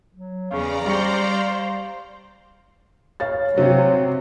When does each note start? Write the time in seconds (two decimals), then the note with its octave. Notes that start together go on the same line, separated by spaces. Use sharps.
0.14 F#3
0.51 E2 C#3 D5 F5 A#5
0.86 G3 C5 F5 C6 C#6 C#7
3.20 C#5 F5 A6
3.57 C3 F#3 C#5